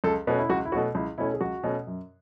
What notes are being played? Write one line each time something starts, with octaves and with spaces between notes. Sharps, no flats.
C#2 A4
B2 A3 C#4 B4
E4
C#2 F#4
E4
B2 A3 C#4 F#4
C#2 E4
B2 A3 C#4 E4
G#4
C#2 F#4
B2 A3 C#4
F#2